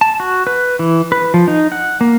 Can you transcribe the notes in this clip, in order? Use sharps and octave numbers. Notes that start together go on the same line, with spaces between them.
A5
F#4
B4
E3
B4
F3
D#4
F#5
A#3